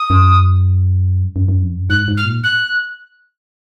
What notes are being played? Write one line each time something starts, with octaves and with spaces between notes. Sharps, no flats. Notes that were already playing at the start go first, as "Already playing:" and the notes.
Already playing: D#6
F#2
F#2
F#2
F2
F#2
G#2 F#6
G#2
F6
A#2
F#6